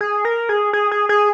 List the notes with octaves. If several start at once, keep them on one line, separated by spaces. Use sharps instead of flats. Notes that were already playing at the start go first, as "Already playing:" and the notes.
G#4
A#4
G#4
G#4
G#4
G#4